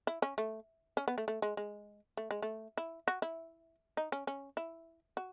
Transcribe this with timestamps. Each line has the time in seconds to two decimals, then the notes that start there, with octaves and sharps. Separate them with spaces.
0.07 E4
0.22 C#4
0.38 A3
0.97 C#4
1.08 B3
1.18 A3
1.28 A3
1.42 G#3
1.57 G#3
2.17 A3
2.31 G#3
2.42 A3
2.77 E4
3.08 F#4
3.22 E4
3.97 D#4
4.12 C#4
4.27 C#4
4.57 E4
5.17 F#4